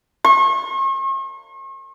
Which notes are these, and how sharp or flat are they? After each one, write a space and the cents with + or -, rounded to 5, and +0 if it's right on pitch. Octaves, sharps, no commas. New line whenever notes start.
C#6 -45